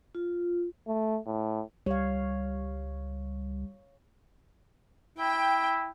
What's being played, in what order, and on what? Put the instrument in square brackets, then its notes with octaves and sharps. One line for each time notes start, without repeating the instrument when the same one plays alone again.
[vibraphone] F4
[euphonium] A3
A2
[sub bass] C#2 [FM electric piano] G3 [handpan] C#5 F5
[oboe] E4 [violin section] G5